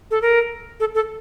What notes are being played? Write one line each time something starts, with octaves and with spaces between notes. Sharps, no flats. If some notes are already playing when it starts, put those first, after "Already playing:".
A4
A#4
A4
A4